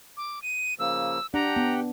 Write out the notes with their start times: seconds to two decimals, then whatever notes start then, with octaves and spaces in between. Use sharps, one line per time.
0.17 D6
0.42 D#7
0.79 C#3 F3 A#3 E6
1.34 D4 G4 F#5 G5 A#5
1.56 B3